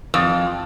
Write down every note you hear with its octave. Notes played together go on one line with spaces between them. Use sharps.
F2